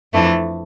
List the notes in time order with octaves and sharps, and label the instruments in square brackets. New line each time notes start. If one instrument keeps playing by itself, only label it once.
[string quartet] F2 E3 A3 D4